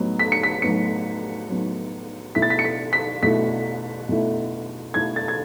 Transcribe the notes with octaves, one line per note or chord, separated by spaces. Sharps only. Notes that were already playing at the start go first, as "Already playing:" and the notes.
Already playing: A2 F#3 B3 D#4
B6
C#7
B6
A2 F#3 B3 D#4 C#7
A2 F#3 B3 D#4
B2 A3 E4 B6
A6
B6
C#7
B6
B6
B2 A3 E4 B6
B2 A3 E4
B2 A3 E4 G#6
A6
G#6